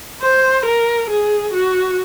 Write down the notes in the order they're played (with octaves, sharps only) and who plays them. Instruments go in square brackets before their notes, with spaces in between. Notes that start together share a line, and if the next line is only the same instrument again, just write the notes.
[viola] C5
A#4
G#4
F#4